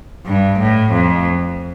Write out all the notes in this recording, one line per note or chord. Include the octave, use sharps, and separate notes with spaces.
G2
A2
F2